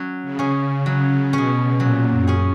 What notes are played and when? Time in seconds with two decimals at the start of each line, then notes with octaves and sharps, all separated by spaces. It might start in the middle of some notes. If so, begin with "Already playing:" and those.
Already playing: F#3 C#4
0.23 C#3
0.39 C#4 G#4
0.55 C#3
0.86 C#3 F#3
1.33 B2 C#4 G#4
1.80 A#2 F#3
2.11 F#2
2.27 C#4 G#4